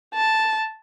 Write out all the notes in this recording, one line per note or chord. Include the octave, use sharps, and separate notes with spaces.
A5